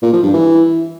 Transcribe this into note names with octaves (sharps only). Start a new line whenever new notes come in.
A#2
F3
G2
E3